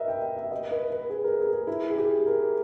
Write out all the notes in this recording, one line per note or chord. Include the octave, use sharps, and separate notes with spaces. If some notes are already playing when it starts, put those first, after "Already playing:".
Already playing: A#4 B4 D#5 E5
G5
G5
E5
D#5
B4
B4
G#4
A#4
G#4
G#4
E4
G#4
G4
A#4